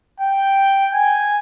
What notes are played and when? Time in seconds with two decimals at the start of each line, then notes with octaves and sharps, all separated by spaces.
0.20 G5
0.94 G#5